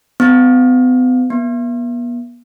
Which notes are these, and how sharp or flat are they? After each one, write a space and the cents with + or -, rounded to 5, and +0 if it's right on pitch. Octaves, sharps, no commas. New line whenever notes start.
B3 +40
B3 -40